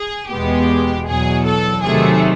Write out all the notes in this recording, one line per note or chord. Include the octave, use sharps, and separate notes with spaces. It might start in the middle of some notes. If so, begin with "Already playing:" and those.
Already playing: G#4
E2 B2 G#3 B3 G4
E2 B2 F#3 G#4
A4
C3 D#3 F#3 A3 G#4